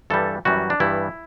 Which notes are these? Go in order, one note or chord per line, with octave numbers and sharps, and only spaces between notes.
G2 E3 G3 A4
F#2 E3 G3 F#4
D4
G2 E3 G3 E4